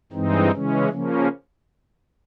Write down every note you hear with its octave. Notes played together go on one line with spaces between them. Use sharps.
G2 E3 G#3 C4 D#4
C#3 E3 G#3 C#4
C#3 F3 A#3 C#4